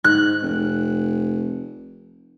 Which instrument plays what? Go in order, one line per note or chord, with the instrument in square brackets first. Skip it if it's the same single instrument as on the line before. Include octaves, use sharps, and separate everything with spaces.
[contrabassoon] G#2 [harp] F#6
[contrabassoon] F1